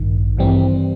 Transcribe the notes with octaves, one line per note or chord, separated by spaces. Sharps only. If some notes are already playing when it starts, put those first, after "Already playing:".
Already playing: A1 G2 D#3
G2 E3 G3 C4